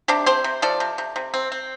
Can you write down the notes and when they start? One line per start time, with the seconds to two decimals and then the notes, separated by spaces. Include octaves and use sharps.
0.08 C3 D4 G4
0.26 C4 G4 C5
0.44 C3
0.62 F3 A4 D5
0.80 C3
0.98 C3
1.16 C3
1.34 C4
1.52 C4